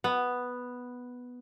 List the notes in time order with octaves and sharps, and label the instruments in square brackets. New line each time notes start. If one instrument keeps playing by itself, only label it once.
[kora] B3